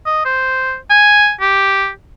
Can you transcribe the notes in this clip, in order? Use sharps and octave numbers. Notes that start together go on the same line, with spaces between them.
D#5
C5
G#5
G4